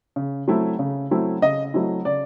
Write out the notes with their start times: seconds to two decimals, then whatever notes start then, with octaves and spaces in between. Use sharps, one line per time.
0.16 C#3
0.48 F#3 A3 C4 E4
0.79 C#3
1.11 F#3 A3 C4 E4
1.42 C#3 D#5
1.74 F#3 A3 C4 E4
2.05 C#3 D5